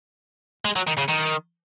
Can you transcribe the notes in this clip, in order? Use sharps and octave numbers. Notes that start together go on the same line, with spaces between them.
G#3
F#3
D#3
C#3
D#3